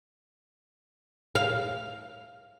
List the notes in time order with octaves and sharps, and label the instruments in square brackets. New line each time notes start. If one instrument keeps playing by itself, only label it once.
[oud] F5